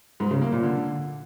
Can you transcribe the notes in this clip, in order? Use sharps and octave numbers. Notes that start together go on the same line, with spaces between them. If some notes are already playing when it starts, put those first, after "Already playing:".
G#2
C#3
A#3
A#2
D3